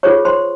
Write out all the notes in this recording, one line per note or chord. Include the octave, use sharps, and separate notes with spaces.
F4 G#4 C5 C#5 C#6
C5 C6